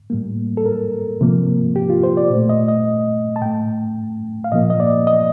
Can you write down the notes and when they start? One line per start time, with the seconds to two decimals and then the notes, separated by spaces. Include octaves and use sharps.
0.10 A2 G3 A#3
0.57 A4
0.66 A#4
1.21 C3 F3 A#3
1.76 G4
1.90 F4
2.03 C5
2.17 D5
2.31 A#2 A3
2.49 D#5
2.68 D#5
3.36 A5
3.41 A2 A3 G5
4.44 F5
4.52 A#2 F3 A#3 D#5
4.70 D#5
4.80 D5
5.07 D#5